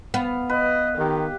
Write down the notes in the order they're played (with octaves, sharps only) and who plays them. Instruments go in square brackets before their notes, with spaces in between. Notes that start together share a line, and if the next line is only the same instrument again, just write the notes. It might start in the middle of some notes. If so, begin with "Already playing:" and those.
[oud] B3 [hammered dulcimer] F5
[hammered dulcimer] B4 [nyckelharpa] D#5
[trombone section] D#3 [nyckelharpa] G4